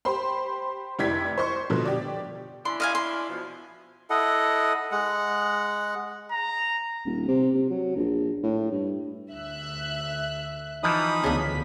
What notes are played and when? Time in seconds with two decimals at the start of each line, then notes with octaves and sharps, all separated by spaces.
0.05 G4 C5 B5 C6
0.99 F1 E4 G4 D5 G#6 B6
1.38 C5 D#5 C6 C#6
1.70 B2 D3 F3
1.85 G4 D5
2.65 C#4 D4 E4 C6
2.80 D#5 F5 G#5
2.95 C6
3.29 B2 F3
4.10 E4 A4 D#5 F#5
4.92 G#3 F#5
6.32 A#5
7.06 D#1
7.28 C3
7.54 C3
7.70 F#3
7.96 A#1
8.43 A2
8.71 G2
9.31 D2 E5 F#6
10.83 E3 F3 D#4 B5 D#6
11.24 D2 C#3 B3 D4 B6